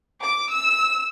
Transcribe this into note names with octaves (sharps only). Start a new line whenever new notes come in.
D6
E6